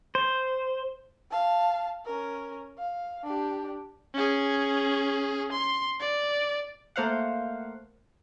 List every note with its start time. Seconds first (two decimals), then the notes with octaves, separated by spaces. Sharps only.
0.15 C5
1.31 F5 A5
2.05 C#4 A#4
2.78 F5
3.24 D4 G4
4.14 C#4 G#4
5.52 C6
6.00 D5
6.96 A3 A#3 C5 F5 F#5